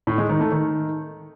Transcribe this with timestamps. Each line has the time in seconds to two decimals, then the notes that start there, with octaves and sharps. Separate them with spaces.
0.07 A2
0.18 G#3
0.29 D#3
0.40 A3
0.52 D#3